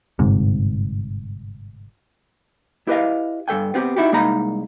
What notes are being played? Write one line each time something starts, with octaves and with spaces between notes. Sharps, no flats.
G1 G#2 C3
E4 G4 B4 C5 D#5 F5
G2 B2 A4 G5 G#5
B3 C4 F#4 G4
D#4 E4 F#4 G4
C2 G#3 A#3 D#4 A#5 B5